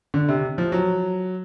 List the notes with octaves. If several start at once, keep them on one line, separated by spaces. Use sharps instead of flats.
D3
C3
F3
F#3